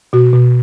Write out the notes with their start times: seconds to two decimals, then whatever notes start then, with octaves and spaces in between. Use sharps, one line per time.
0.13 B2 F#4
0.33 B2